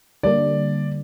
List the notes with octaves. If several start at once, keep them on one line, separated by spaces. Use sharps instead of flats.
D3 G3 A#3 D4 D5